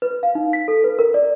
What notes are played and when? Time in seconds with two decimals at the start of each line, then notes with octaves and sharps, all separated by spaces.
0.02 B4
0.23 F5
0.35 D#4
0.53 B6
0.68 A4
0.84 B4
0.99 A#4
1.14 D5